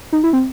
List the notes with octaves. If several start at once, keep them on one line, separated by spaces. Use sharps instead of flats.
D#4
E4
C4